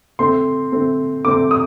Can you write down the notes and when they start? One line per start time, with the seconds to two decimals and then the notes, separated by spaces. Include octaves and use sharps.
0.19 D3 A3 C4 C6
0.72 D3 A3 C4
1.24 D3 A3 C4 D6
1.51 D#6